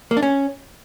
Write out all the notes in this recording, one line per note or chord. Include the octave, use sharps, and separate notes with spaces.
A#3
D4
C#4